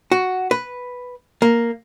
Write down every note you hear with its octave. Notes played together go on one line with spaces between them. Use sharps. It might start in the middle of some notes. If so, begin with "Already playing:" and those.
F#4
B4
A#3